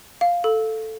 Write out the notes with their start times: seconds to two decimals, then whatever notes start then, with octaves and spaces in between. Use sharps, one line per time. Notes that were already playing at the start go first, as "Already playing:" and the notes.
0.21 F5
0.44 A4